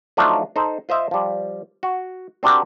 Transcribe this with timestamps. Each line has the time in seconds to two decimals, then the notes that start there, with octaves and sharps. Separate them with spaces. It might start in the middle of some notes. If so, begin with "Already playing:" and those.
0.17 F3 F#3 A3 D4 D#4 F4
0.56 D#4 A4 C5
0.89 F4 C5 D#5 E5
1.11 F3 G3
1.83 F#4
2.43 C4 D4 F#4 G4 A#4